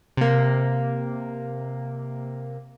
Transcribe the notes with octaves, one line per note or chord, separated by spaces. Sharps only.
C3 A#3